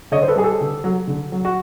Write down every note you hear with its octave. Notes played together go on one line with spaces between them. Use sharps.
D3 C#5 D#5
C5
A4 B4
G3 G#4
G4 A4
D3
F#3
D3
F#3
F#4